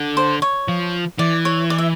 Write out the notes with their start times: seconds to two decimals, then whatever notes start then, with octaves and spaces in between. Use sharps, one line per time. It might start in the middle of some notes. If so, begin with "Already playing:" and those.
Already playing: D3
0.17 C5
0.42 C#5
0.68 F3
1.18 E3 D5
1.45 C#5
1.70 D5
1.78 E5